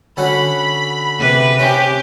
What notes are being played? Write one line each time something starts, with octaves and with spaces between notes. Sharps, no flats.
D3 C#4 F#4 B5
C3 B4
C#4 G4